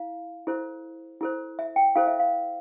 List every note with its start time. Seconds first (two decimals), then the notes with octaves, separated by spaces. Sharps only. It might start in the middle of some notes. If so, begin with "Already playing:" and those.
Already playing: E4 F5
0.47 E4 A4 C5
1.21 E4 A4 C5
1.59 E5
1.76 G5
1.95 E4 A4 C5 F5
2.07 E5
2.20 F5